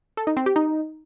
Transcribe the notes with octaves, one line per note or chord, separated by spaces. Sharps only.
A4
D#4
C4
G4
D#4